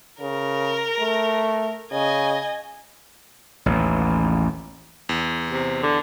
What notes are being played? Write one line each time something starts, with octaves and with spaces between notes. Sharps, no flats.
C#3 A#4
A3
C#3 D#5 G#5
A1 D#2
E2
C3
D3